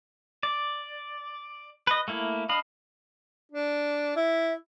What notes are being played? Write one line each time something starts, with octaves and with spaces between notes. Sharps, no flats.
D5
B4 D#5
A3 A#3 E4
D4 D#5 F5 B5
D4
E4 E5